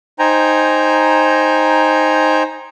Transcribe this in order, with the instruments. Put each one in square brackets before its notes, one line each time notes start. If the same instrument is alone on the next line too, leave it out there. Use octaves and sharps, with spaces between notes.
[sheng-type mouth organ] D#4 C5 G5 G#5 A#5